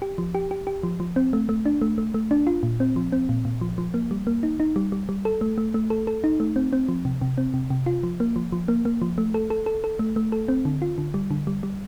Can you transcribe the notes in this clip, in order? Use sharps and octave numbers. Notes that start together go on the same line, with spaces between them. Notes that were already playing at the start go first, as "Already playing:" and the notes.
G4
F3
G4
G4
G4
F3
F3
C4
A3
A3
D4
A3
A3
A3
D4
F4
A#2
C4
F3
C4
A#2
A#2
F3
F3
A#3
G3
A#3
D#4
D#4
G3
G3
G3
A4
A3
A3
A3
A4
A4
D#4
A3
C4
C4
F3
C3
C3
C4
C3
C3
F4
F3
A#3
F3
F3
A#3
A#3
F3
A3
A4
A4
A4
A4
A3
A3
A4
C4
D3
F4
D3
G3
D3
G3
G3